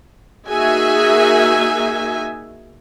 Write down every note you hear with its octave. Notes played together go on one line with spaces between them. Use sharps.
A#3 D#4 F#4 G#4 E5 G#5